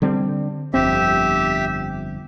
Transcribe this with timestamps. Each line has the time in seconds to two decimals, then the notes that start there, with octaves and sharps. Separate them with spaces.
0.02 D3 G3 C4
0.74 G1 F2 C4 G4 E5